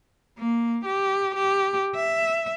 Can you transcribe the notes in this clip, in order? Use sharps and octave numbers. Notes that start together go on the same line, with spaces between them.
A#3
G4
G4
E5